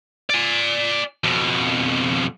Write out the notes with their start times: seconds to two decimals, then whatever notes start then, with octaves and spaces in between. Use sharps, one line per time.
0.30 D5 G#5
1.24 F2 B2